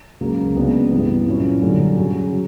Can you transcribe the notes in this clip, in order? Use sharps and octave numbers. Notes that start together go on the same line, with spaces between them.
C#2 C#3 F#3 A#3
C#2 C#3 F#3 B3 D4
G2 E3 B3
A#2 F#3 C#4 E4
F#2 D3 G3
F#2 C#3 F#3
F#3